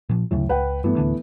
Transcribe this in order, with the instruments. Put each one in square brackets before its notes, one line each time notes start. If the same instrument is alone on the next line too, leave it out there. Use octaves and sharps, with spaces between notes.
[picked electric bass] A#2 F3
[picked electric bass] D2 C#3 F#3 [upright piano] A2
[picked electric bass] C#2 [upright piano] B4 F#5 G5
[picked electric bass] G2 [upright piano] E3 A3 B3
[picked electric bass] D1 D3 D4